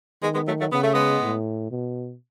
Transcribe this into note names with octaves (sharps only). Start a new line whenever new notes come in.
D#3 G#3 B3
G#3 B3
F#3 A3
F#3 A3
C#3 B3
A3
G#3 B3
A2
B2